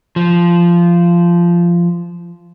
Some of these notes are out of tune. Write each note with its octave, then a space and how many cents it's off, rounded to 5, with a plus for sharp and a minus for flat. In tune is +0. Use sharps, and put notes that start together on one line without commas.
F3 -15